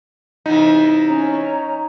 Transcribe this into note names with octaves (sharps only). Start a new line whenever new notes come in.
C3 E3 B3 D#4
C#4 C#5 A#5